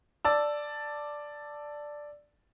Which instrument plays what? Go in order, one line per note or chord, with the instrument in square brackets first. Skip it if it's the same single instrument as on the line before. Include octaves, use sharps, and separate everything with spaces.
[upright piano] D5 A5 E6